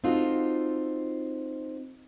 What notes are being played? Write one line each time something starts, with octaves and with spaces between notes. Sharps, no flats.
C4 D#4 F4 F#4 A4